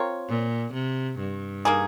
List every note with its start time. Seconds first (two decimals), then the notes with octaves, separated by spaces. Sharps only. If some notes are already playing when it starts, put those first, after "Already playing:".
Already playing: C4 F4 A#4 C#5
0.29 A#2
0.74 C3
1.20 G2
1.65 A#3 D#4 G#4